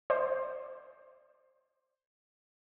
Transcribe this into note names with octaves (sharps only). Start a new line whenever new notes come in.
C5 D5